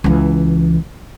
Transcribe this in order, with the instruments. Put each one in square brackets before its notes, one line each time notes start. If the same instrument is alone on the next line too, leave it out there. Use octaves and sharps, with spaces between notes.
[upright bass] C#2 E3